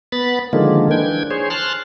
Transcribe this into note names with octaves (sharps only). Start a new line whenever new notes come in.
B3 B5 A6
D3 D#3 F3 G#3 A#3
E3 D4 G5 G#6
G#4 C5 C#5
A5 C6 F6 F#6